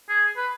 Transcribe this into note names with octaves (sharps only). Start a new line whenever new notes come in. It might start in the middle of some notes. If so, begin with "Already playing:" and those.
G#4
B4